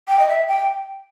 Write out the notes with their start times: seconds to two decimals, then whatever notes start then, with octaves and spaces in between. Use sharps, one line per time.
0.08 G5
0.19 D#5
0.28 E5
0.48 G5